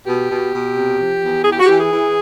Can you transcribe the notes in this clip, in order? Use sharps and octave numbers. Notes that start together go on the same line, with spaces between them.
B2 G4
B2
B2
C3
F3
E2
E3 G#4
G4
F#4
E3 G4
G#4
E3